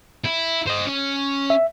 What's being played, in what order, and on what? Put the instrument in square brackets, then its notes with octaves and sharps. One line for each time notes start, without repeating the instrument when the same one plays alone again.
[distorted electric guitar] E4
C5 D#5
C#4
[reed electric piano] E5